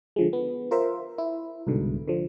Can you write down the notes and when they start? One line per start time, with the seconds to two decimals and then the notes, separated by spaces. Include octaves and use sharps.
0.16 D3 F3 G#3
0.33 B3
0.71 F4 A#4 C5 E5
1.18 E4
1.67 C2 G#2 B2 D3
2.08 D3 F3